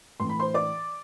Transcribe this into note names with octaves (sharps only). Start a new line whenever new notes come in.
A2 E3 C6
B5
C5 C6
D5 D6